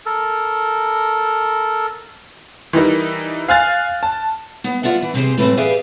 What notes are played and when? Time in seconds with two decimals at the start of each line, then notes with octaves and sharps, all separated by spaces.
0.06 A4 A#4
2.73 E3 G3 D#4 A#4
3.48 F5 G#5 F6 F#6 A6
4.03 A5
4.64 B3
4.83 F4 D5 E5 F#5
5.02 E3
5.14 C3 C4 G4 G#4 C5
5.38 A2 E3 A#3 C4
5.57 G4 G#4 B4 D5 E5 F5